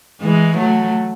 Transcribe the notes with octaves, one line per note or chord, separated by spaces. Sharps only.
E3 G#3
F#3 A3